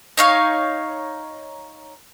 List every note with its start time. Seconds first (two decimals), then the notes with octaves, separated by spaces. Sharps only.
0.17 D#4 C#5 F5